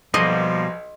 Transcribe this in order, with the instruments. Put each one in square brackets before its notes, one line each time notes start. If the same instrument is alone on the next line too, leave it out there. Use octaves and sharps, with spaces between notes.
[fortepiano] B1 [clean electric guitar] B2 G3 A#3 [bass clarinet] F3 [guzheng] D#5